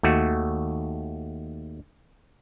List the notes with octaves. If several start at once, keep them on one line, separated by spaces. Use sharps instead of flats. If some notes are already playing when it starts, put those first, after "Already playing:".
D#2 A3 F#4